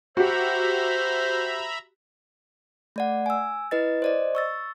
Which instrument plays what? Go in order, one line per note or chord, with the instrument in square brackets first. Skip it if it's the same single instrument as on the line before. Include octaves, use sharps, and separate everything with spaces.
[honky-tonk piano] F#4 G4 [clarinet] C5 [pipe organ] E5 A#5 B5
[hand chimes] A3 D5 F#5
G#5 E6
E4 B4 D#5 A6
C5 D5 D#5
C#6 E6 A6